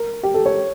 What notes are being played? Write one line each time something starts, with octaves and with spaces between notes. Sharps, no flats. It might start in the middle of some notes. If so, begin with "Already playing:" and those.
Already playing: A#4
G4
A4
C#5